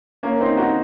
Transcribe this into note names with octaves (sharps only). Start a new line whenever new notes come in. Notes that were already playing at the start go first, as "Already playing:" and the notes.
A#3 C#4
C4 D#4
D#4 F#4